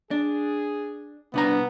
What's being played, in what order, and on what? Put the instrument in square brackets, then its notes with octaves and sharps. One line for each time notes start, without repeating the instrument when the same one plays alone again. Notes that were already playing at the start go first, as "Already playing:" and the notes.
[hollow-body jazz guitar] D4 [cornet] G#4
[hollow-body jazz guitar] C2 D4 A#5 [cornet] B3